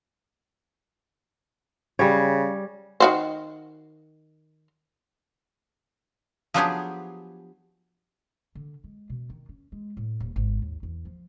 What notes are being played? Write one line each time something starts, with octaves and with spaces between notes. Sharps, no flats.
C#3 G3 C#5
D#3 F#4 C5
F3 F#3 B3 D4 G4 G#4
D3
G#3
B2
D#3
C#4
G#3
A2
D#1
G#1
D#2
E2
F3